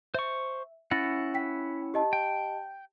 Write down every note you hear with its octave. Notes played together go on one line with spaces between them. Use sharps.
C5 E5 C#6
C#4 E4 F#5 A6 A#6
G5 B6
G4 D#5 A5
G5